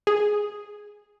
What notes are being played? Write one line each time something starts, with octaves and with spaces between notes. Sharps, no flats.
G#4